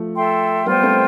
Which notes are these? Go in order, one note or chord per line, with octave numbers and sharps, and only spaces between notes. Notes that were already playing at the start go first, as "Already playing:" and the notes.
Already playing: F3 A3
A4 E5 G5 C6
G3 B3 F4 C5 G5
A3 C4